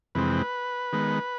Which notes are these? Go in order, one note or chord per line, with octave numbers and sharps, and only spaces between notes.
F2 C3 E3 G#3 C4 B4
D#3 G#3 B3